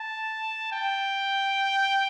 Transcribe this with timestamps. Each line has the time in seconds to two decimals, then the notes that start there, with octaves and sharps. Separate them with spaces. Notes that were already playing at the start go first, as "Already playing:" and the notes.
Already playing: A5
0.72 G5